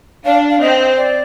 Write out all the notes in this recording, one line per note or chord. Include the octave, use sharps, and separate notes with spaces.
D4 F5
F5
C4 D#5
D5